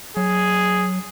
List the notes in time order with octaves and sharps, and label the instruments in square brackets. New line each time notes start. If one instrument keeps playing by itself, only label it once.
[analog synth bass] F#3 [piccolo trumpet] G#4